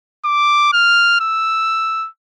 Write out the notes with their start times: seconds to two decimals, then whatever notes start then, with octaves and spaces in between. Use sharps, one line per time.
0.25 D6
0.73 F6
1.21 E6